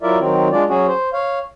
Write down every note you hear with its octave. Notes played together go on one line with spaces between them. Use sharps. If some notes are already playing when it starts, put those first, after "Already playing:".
F#3 E4 F4 A#4 D5 E5
D#3 F#3 C4
G#3 D4 F4 D5
F#3 C#4 F#4 G#4
C5
C#5 F5